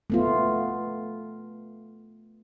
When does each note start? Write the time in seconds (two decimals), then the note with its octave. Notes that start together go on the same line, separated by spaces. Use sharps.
0.10 A3 B3 F4